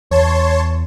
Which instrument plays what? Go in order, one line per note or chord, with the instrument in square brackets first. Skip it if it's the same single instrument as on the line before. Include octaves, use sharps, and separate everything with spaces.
[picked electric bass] E2 [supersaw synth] C#5 A5 C6